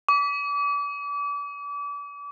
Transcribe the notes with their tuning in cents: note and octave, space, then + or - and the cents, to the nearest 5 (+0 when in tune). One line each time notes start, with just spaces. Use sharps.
D6 -35